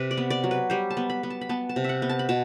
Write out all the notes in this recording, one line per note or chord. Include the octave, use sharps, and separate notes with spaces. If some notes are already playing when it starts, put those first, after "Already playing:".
Already playing: C3 B4
D5
B3
D5
F#3
B4
G3 C5
A5
B3
B5
B3
A5
B5
B3 A5
A5
C3
E5 F#5
B3
A5
B5
B2 A5